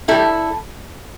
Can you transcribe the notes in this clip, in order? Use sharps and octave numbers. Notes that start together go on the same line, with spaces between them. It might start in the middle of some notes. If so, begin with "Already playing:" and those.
A2 G3 E4 A4